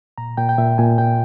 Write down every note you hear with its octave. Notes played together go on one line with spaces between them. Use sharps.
A#2 A#5
A#2 G5
G5
A#2 E5
A#2 G#5
A#2 G5